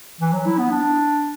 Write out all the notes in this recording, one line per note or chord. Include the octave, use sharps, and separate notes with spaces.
E3
F#3
E4
B3
D4